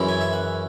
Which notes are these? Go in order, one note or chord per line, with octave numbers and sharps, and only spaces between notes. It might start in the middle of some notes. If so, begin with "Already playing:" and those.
Already playing: F#2 E3 G#3 C#4 E4
G#5
E5
F#5